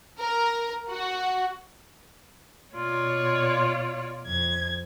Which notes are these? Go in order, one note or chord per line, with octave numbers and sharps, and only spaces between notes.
A#4
F#4
B2 F4 C#5 D5
F2 G#6